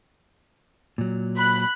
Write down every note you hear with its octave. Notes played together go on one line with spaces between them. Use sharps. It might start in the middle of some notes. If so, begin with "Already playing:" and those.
A#2 F#3
B5 F#6